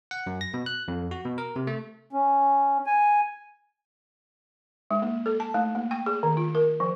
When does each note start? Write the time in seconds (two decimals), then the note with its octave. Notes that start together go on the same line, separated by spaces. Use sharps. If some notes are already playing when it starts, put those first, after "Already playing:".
0.11 F#5
0.27 F#2
0.41 A#6
0.54 B2
0.66 F#6
0.88 F2
1.11 F#4
1.25 B2
1.38 A#4
1.56 C3
1.67 A3
2.13 C#4
2.86 G#5
4.91 G#3
5.02 A#3
5.26 A4
5.40 A5
5.54 A3
5.75 A#3
5.91 G5
6.06 G#4
6.23 D#3
6.37 F4
6.55 A#4
6.80 F3